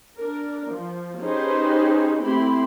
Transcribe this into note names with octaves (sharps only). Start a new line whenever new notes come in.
D4 A#4
F3
C#4 D#4 G4 G#4 B4 C5
A3 C4 E4 G4 B5 C6